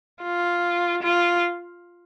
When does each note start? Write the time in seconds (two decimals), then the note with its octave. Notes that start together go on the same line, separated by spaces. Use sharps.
0.22 F4
1.03 F4